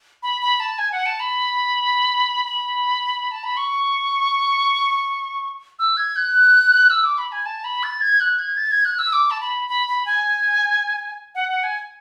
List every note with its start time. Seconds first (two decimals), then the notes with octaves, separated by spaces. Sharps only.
0.23 B5
0.41 B5
0.60 A5
0.78 G#5
0.92 F#5
1.06 A5
1.20 B5
2.45 B5
3.31 A5
3.44 B5
3.57 C#6
5.79 E6
5.97 G#6
6.16 F#6
6.90 E6
7.04 D6
7.18 B5
7.32 G#5
7.46 A5
7.64 B5
7.83 A6
8.01 G#6
8.20 F#6
8.39 G#6
8.57 A6
8.71 G#6
8.85 F#6
8.99 E6
9.13 D6
9.31 A5
9.40 B5
9.68 B5
9.87 B5
10.06 G#5
11.35 F#5
11.50 F#5
11.64 G#5